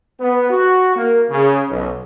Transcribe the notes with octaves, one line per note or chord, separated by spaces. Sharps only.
B3
F#4
A#3
C#3
B1